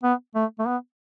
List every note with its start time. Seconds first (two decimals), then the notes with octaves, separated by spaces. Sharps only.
0.04 B3
0.35 A3
0.59 A3
0.67 B3